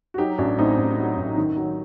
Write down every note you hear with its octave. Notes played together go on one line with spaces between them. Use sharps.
F#4
F#3 D#4 G4
A1 D4 F#4
A2 C4 D#4
A1
F#3
A1
D#3
F#3